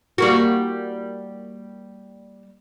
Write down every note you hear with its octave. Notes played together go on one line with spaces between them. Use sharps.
G3 A#3 F#4